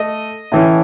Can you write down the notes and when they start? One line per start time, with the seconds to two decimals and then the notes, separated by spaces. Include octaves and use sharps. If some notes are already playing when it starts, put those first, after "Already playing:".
Already playing: A3 D#5
0.52 A2 E3 A3 C#4